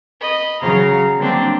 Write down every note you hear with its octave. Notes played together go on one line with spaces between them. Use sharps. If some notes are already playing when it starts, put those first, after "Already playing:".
D#5 B5
C#3 F#3 G#4 F5 A#5
D3 F#3 G3 A#3 C4 D4